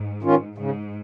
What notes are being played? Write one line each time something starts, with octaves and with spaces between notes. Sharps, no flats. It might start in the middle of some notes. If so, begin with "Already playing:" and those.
Already playing: G#2
D#3 C#4 F4
G#2 C#3